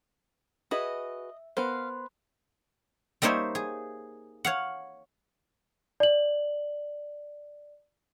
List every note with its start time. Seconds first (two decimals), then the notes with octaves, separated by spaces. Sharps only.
0.71 F#4 G#4 B4 D#5 E5
1.57 B3 A#4 C5 F5 B5 C6 F#6
3.22 G3 A#3 D#4 C5 C#5 E5
3.55 G#4
4.45 C#5 F5 F#5
6.00 D5 F#7